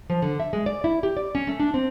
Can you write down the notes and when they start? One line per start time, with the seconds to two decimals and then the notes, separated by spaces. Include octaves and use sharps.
0.10 F3
0.22 D3
0.40 E5
0.53 G#3
0.66 D5
0.84 E4
1.03 G4
1.17 D5
1.35 C#4
1.47 A3
1.60 D4
1.74 C4